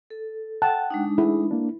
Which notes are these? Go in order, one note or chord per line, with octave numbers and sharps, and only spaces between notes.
A4
F#5 G5 A5 F#6
G#3 D4 D#4
E4 G#4
A#3 D4